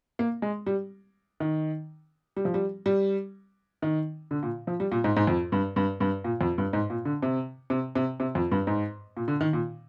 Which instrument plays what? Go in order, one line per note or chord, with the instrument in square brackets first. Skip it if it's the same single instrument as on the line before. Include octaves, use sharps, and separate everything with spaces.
[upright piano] A#3
G#3
G3
D#3
G3
F3
G3
G3
D#3
D3
A#2
F3
G3
A#2
G#2
G#2
F2
G2
G2
G2
A#2
F2
G2
G#2
A#2
D3
C3
C3
C3
C3
F2
G2
G#2
A#2
D3
D#3
A#2